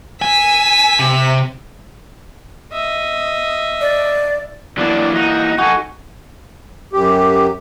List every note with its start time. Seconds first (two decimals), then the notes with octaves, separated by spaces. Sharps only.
0.22 G#5 E6 B6
1.00 C3
2.72 D#5 E5
3.81 D5
4.78 E3 F#3 A#3 D4 D5
5.15 D#4 F#4
5.58 D#4 F#4 A4 G#5
6.93 F#2 G4